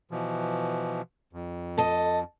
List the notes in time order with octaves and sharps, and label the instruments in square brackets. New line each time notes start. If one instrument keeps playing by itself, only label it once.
[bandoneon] B2 E3 F3
F2
[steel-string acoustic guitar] A4 D#5